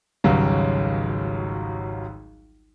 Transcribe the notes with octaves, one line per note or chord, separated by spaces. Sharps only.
G#1 C#2 C#3 F#3 G3